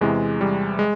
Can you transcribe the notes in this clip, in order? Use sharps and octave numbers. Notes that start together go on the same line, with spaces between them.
E2 C3 E3 G#3
G3
G#3